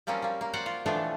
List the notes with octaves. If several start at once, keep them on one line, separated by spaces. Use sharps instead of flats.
F3 G3 A#3 C4 C#4
G3 A#3
A#3
F#4 C5 D5 F#5 G5
F4
B2 E3 F3 A3 D4 F4